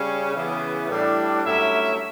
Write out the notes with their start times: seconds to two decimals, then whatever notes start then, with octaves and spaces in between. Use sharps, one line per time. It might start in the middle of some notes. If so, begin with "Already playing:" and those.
Already playing: C#3 G3 C#4
0.33 C#3 E3 B3
0.89 A2 G3 D4
1.44 G2 F#3 A3 C#4 E4 E5